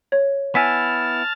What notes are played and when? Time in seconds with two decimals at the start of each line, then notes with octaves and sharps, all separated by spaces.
0.12 C#5
0.55 B3 E4 G#5 A5 F6 A6 B6